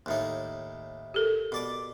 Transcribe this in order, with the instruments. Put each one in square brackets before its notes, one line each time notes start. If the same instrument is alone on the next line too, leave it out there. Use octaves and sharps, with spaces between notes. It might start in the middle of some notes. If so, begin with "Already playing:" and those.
[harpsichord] D#2 A2 D#4
[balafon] G4 A4 A#4
[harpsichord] B2 D5 D6